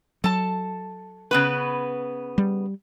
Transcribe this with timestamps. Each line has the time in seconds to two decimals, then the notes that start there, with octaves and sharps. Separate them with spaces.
0.24 F#3 A4 A5
1.31 C#3 B3 B4
2.38 G3